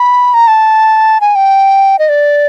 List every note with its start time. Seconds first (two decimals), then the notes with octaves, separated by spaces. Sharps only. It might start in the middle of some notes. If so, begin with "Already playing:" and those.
Already playing: B5
0.34 A#5
0.48 A5
1.21 G#5
1.35 G5
1.99 D#5
2.09 D5